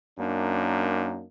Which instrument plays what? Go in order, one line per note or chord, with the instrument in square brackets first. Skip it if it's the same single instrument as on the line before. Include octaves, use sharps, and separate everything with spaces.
[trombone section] F#2 A#3 D4 D#4